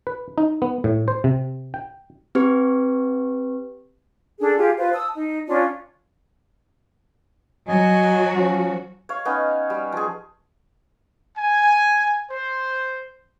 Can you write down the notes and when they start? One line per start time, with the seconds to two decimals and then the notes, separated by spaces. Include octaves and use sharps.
0.07 B4
0.38 D#4
0.62 B3
0.84 A2
1.08 C5
1.24 C3
1.74 G5
2.35 C4 G4 B4
4.40 D4 G#4 A4
4.58 F4 G4 G#4
4.78 F4 B4 C5
4.93 A5 D#6 E6
5.14 D#4
5.47 C#4 D4 F4 D5
7.68 F#3 F#4 D#5 G#5
8.35 F3 C#4
9.09 C#5 F5
9.25 B3 C#4 D#4
9.70 G3
9.92 F3 G#4
11.36 G#5
12.31 C5